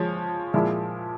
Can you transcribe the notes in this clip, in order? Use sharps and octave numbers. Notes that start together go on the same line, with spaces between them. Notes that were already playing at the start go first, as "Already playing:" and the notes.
Already playing: F3 G#3 C#5
A#2 F3 G#3 E4